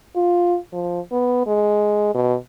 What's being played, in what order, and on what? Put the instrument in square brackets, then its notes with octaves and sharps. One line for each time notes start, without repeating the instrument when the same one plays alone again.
[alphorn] F4
F3
B3
G#3
B2